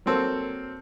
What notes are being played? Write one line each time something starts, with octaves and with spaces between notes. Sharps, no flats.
F#3 A#3 C4 A4